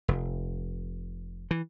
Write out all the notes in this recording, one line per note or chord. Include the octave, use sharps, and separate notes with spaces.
F1
E3